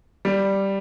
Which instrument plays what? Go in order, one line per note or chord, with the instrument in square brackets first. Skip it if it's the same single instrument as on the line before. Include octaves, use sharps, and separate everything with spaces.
[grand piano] G3